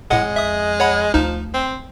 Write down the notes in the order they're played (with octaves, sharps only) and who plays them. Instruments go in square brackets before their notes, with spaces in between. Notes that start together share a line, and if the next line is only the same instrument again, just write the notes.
[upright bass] F2 [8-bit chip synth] A2 F#5 [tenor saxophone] G#3
[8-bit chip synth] E5 D#6
C#5 F#5 B5
[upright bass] D2 [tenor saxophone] F3 [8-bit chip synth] D#4
[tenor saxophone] C4